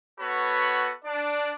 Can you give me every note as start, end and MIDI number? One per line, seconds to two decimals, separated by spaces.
0.20 0.93 59
0.20 0.93 66
0.20 0.93 69
0.20 0.93 71
0.20 0.93 73
0.20 0.93 83
1.05 1.52 62
1.05 1.52 74